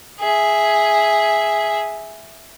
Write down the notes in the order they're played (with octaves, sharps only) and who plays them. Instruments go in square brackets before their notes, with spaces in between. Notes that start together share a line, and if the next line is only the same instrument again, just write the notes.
[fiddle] G#4 E5